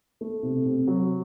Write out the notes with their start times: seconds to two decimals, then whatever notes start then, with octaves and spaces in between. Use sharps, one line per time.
0.21 A3
0.43 C3
0.65 C3
0.87 F#3